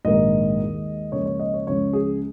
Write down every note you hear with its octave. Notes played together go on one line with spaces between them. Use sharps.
A#1 G#2 D#3 A#3 D#5
D#2 D#3 G#3
C#2 C#3 F3 A#3 C#5
C#5
D#5
C#5
C#2 C#3 F3 C#5
G#4